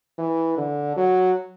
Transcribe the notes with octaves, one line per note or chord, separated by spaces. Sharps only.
E3
D3
F#3